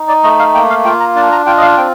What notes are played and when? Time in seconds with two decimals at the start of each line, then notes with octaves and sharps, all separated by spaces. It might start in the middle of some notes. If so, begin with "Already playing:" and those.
Already playing: D#4
0.08 D5
0.24 A3 D#5
0.39 F5
0.54 A#3 G5
0.70 F5
0.85 F4 G5
1.00 A#5
1.15 D4 A5
1.32 A#5
1.46 F4 G5
1.57 D#5
1.62 F5
1.77 C4 G5